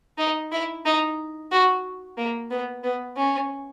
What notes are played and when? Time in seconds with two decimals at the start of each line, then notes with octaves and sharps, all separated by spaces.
0.18 D#4
0.52 E4
0.85 D#4
1.52 F#4
2.18 A#3
2.51 B3
2.83 B3
3.17 C#4